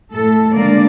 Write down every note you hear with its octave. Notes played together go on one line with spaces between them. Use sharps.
A2 A4
D3 G#3 A#3 D5